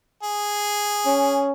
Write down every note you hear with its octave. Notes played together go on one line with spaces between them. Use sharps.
G#4
C#4